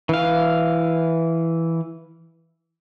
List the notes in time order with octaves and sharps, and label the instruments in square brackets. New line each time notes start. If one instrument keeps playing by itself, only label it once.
[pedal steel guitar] E3 F5